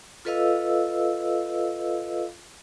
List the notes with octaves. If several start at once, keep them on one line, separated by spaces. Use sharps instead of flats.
F4 A4 B4 D#5 F5 E6